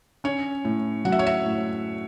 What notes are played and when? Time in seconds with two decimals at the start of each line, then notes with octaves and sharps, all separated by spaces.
0.24 C#4 C#5
0.65 A2
1.05 F#3 F#5
1.12 E5
1.19 C#5
1.27 E5
1.45 A2